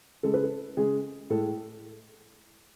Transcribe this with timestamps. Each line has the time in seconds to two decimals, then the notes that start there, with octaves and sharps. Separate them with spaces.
0.23 C#3 G#3 A4
0.34 B4
0.43 A4
0.77 C#3 G#3 G#4
1.30 A2 G#3 A4